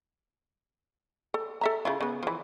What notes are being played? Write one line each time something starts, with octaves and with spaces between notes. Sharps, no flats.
A4
A4 E5 A#5
C#3 E4 F4
C#3 B3
E3 F3